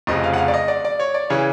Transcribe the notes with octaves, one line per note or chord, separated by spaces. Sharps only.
F1 F2 C#3 D#5
F5
F#5
F5
D5
D#5
D5
D5
C#5
D5
C#3 E3 C#5